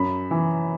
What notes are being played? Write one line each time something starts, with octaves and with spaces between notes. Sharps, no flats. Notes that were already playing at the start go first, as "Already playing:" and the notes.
Already playing: F#2 B5
E3